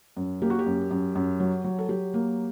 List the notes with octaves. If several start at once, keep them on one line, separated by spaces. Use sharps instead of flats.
F#2
A#3 G4
F#4
G4
F#2
F#2
F#2
F#3
F#3
A4
F#3 G4
A#3